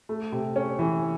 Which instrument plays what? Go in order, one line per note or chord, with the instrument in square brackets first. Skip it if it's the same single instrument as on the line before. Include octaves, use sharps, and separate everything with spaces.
[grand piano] A3
C3
C#4
E3